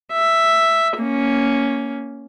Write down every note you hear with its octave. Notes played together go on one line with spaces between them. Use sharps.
E5
A#3 C#4